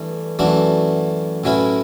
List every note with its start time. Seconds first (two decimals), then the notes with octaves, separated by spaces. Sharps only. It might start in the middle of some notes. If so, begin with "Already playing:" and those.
Already playing: G2 E3 A3
0.39 F#2 E3 A3 D4 F#4
1.44 A2 F#3 C#4 E4 B4